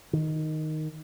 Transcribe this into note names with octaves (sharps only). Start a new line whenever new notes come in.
D#3